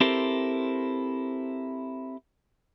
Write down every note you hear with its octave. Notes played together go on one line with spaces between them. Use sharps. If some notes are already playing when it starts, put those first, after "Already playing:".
C4 E4 G4 A4 A#4 C5